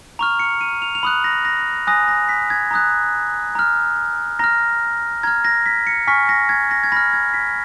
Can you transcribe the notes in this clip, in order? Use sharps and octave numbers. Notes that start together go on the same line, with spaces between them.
A#5 C#6 F6 F7
C#7
D#7
F7
F7
B5 D#6 F#6 F#7
A#6
A#6
G#5 D#6 F#6 A#6
A#6
B6
G#6
A#5 D#6 F#6
A#5 F6
A#5 F6 A#6
A#5 F6 G#6
A#6
B6
C#7
G#5 C#6 F6 B6
A#6
G#6
A#6
G#6
B5 F6 A#6
G#6
B6